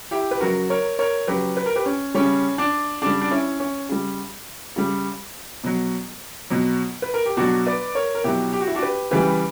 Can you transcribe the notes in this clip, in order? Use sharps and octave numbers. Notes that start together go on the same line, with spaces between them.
E4 G4
B4
C#3 F#3 F#4 A#4
A#4 C#5
A#4 C#5
C#3 F#3 G4 B4
B4
A#4
G4 B4
C#4
C#3 G3 C#4
D4
C#3 G3 D4
D4
C#4 E4
C#4
C#3 G3
C#3 G3
B2 F#3
B2 F#3
B4
A#4
G4
B2 F#3 D4 F#4
B4 D5
A#4 C#5
A#4
B2 F#3 E4 G4
G4
F#4
E4
D4 F#4
G4 B4
C#3 E3 G3 G4 B4